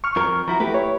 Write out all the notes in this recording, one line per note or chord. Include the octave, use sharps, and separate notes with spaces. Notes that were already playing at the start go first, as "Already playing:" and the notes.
C#6 F6
F2 F3 A#4
F3 E4 F#4 A#5
A3 E4 G4 B4
C#5